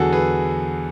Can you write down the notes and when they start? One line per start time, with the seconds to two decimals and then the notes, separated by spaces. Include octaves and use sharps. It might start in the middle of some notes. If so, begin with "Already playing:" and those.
Already playing: E2 D3 F#3 F#4 G#4 A4 F#5
0.13 G#4 B4